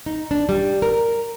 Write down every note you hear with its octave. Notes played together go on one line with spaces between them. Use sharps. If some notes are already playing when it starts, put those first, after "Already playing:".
D#4
D4
G3
A#4